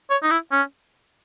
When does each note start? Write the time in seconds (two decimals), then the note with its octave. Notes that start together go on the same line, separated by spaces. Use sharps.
0.10 C#5
0.23 D#4
0.31 E4
0.52 C#4